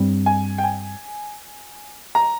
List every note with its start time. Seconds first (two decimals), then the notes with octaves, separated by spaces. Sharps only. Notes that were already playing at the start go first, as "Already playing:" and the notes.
Already playing: G2 G3 C4
0.26 G#5
0.58 G5
0.64 G#5
2.15 A#5